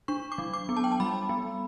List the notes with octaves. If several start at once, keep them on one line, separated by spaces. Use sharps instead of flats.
D4 C#6
D6
F#3
D6
B3
A5
G5
A5
G3 B5
B3